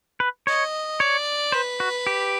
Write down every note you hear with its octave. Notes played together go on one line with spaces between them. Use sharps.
B4
C#5 D#5
C#5 D5
B4 C5
F#4
G4